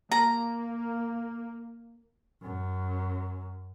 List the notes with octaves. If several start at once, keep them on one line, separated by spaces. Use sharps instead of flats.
A#3 A#5
F#2